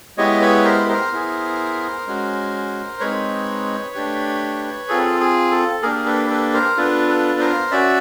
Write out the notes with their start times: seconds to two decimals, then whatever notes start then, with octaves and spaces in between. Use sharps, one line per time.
0.18 G#3 B3 E4 G4 C#5 D#5
0.41 B4 C#5
0.64 A#4 C5
0.80 B4
0.89 A#4 C5
1.12 B3 E4 G#4
2.07 G#3 C#4 F#4
3.00 G#3 C4 D#4 B4 C#5
3.95 A3 D4 G4
4.89 C4 F4 G#4 A4
5.20 G#4
5.51 A4
5.83 A#3 D4 G4 G#4 A#4
6.06 A4 B4
6.30 A4 B4
6.54 A#4 C5
6.77 B3 D4 F4 A4 B4
7.08 A4 B4
7.40 A#4 C5
7.71 C#4 F#4 D5 E5